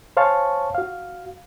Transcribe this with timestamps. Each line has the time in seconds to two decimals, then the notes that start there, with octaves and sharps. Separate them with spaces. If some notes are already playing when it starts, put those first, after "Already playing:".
0.17 C5 C#5 F5 G#5 A5 C#6
0.75 F#4 F5